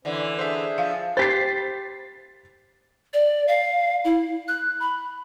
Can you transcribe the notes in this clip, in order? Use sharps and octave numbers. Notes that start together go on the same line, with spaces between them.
D3 E3 C#4 C5
D4 G#4 C5 E5
F3 F5
G4 C5 A6 B6 C7
D5
F5
E4
F#6
B5